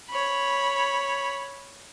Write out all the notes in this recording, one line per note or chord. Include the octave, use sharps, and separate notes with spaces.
C#5 B5